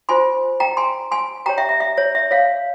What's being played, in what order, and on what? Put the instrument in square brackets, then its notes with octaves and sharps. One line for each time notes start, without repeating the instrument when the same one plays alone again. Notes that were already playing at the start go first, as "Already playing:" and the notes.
[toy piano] F4 C5 G#5 C6
G5 A#5
G#5 C6
G#5 C6
G4 C#5 G5 A#5
E5 G5
E5
E5
C#5
E5
C#5 F5